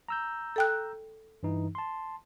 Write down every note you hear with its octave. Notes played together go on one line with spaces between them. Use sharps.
A#5 E6 G6
A4 G5 F#6
G2 E3 D#4
A5 C6